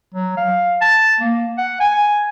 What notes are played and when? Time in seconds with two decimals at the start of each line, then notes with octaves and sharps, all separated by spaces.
0.14 F#3
0.37 F5
0.81 A5
1.20 A#3
1.58 F#5
1.80 G#5